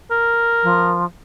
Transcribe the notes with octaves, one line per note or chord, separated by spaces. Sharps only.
A#4
F3